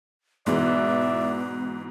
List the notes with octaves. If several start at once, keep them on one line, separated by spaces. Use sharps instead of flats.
G#2 B2 E3 B3 D5 E5